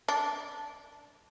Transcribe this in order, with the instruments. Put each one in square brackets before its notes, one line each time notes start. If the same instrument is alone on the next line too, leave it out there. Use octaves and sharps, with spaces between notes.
[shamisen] D4